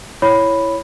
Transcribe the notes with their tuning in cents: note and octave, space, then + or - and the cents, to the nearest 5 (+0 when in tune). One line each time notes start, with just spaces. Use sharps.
E4 +15 C#5 +0 B5 +0